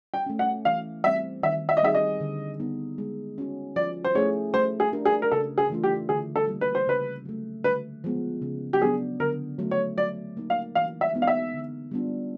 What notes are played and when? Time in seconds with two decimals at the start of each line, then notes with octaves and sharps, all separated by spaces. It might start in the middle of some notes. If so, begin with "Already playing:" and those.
0.14 G5
0.26 A3 C#4
0.39 F#5
0.65 E3 F5
1.04 G3 C4 E5
1.43 D#3 E5
1.69 E5
1.77 D#5
1.82 G3 C4 D#4 G#4 E5
1.95 D#5
2.21 D3
2.60 G3 B3 D#4
2.98 G#3
3.38 C#4 F#4
3.76 F3 D5
4.04 C5
4.15 A3 C#4 E4 G#4 C#5
4.54 A3 C5
4.80 G#4
4.93 D4 G4 A#4
5.05 G#4
5.22 A#4
5.32 C#3 A4
5.58 G#4
5.70 E3 A3 D4 F4
5.83 G4
6.09 D3 G#4
6.36 A4
6.48 G3 A#3
6.61 B4
6.75 C5
6.87 C#3 B4
7.25 F#3 A3
7.64 D3 B4
8.04 F3 G#3 B3
8.42 C#3
8.73 G4
8.81 F#3 B3 D4 G#4
9.20 D3 A#4
9.59 F#3 A3
9.71 C#5
9.97 F#3 D5
10.37 A#3 D#4
10.50 F5
10.75 E3 F5
11.01 E5
11.14 G#3 B3 D#4
11.22 F5
11.27 E5
11.54 D3
11.91 G3 B3 D4 F4